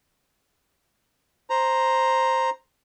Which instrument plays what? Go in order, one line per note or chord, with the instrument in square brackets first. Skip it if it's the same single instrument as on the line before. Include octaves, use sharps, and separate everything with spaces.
[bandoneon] C5 A#5